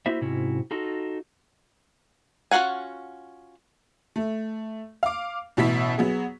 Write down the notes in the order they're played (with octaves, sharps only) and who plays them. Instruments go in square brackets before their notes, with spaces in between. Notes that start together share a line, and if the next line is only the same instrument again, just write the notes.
[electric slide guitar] A#3 E4 F#4 C5 E5
G#2 C3 C#4 E4 F#4
D#4 F4 F#4 A4
[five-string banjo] C#4 F4 F#4 F#5 G#5
[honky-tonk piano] A3
F5 D6
A1 B2 E4 E5 B6
F#3 B3 G#4